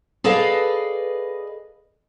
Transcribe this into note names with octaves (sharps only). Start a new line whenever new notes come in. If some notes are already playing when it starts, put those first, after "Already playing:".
G#4 A4 B4 D5 D#5 F5